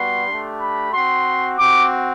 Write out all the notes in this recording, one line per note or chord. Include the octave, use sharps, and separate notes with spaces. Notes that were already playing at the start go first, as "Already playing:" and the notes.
Already playing: G3 B3 F#4 C6
A3 D4 G4
B5
C4 F#4 C6
C4 F#4 D6